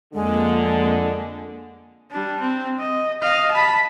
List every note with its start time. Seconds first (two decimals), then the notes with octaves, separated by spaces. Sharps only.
0.14 F2 D3 G#3 A#3
2.11 G3 D4
2.40 C4
2.79 D#5
3.21 D#5 F5
3.52 A5 B5